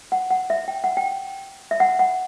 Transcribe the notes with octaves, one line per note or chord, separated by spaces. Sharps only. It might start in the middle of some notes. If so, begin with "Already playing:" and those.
F#5
F#5
E5
G5
F#5
G5
E5
F#5
F#5